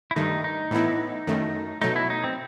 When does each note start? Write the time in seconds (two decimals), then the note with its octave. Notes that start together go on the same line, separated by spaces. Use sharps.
0.11 E4
0.16 G2 D#3 A3 D#4
0.44 D#4
0.71 A2 E3 B3 E4
1.27 F#2 D#3 A3
1.81 B2 F#3 A3 D#4
1.96 E4
2.10 D#4
2.24 C4